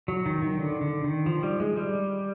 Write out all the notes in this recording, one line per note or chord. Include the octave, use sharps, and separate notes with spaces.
F#3
D#3
D#3
D3
D3
D#3
F3
G3
G#3
G3